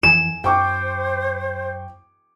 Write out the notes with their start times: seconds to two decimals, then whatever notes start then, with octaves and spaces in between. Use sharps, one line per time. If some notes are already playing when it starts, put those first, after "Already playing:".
0.03 F2 E3 F3 G#5 E7
0.44 F#2 C5 G5 C#6 D6